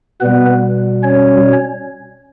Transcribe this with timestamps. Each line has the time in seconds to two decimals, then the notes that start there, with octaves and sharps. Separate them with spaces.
0.20 B2 G3 B3 B4
1.03 C#4 C#5